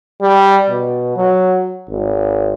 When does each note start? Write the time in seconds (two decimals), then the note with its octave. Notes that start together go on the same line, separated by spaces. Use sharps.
0.21 G3
0.69 B2
1.16 F#3
1.89 G#1